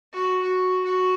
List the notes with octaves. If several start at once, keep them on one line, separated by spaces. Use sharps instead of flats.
F#4
F#4
F#4